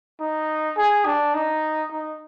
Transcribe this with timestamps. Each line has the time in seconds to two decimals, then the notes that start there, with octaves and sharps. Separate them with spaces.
0.20 D#4
0.77 G#4
1.06 D4
1.34 D#4
1.91 D#4